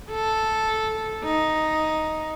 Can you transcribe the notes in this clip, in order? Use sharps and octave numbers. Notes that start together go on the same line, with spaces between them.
A4
D#4